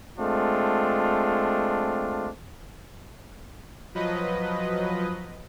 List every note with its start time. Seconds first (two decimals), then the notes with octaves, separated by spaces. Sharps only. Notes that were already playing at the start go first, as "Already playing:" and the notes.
0.19 G#3 A3 C4 D4 F4
3.95 F3 F#3 B4 D#5